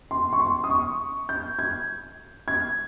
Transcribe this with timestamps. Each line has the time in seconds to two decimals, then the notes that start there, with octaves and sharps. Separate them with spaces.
0.11 C6
0.33 C#6
0.40 C6
0.64 D#6
0.70 C#6
1.29 G6
1.59 G#6
2.48 G#6